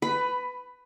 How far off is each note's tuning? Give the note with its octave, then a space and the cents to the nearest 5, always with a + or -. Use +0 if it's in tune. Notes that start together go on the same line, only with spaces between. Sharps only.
B4 +15 B5 +0